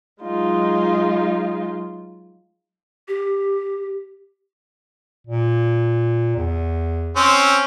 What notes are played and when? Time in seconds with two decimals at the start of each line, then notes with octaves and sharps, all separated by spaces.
0.23 F#3 G#3 D#4 F4
3.08 G4
5.27 A#2
6.37 E2
7.16 C4 C#4